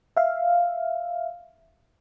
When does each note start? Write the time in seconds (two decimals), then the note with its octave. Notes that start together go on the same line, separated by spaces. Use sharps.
0.17 E5 F5